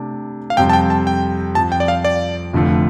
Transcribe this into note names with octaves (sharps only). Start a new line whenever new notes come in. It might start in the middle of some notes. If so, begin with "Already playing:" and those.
Already playing: C3 A3 D4
F5
F2 C3 G3 C4 G5
A5
G5
A5
G5
F2 F3 C4 A5
G5
D5
F5
D5
F1 F2 D3 A3 F4